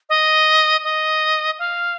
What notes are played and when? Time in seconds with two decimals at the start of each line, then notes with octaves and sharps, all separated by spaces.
0.09 D#5
0.83 D#5
1.59 F5